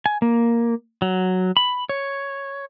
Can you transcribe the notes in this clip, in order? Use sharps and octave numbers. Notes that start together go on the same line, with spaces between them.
G#5
A#3
F#3
B5
C#5